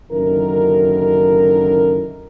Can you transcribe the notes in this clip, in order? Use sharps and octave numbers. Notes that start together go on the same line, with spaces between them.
F#1 F#2 D3 D#3 E4 A#4